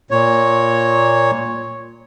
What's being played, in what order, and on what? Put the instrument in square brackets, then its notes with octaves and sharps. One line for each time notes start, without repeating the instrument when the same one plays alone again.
[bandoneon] A#2 C#5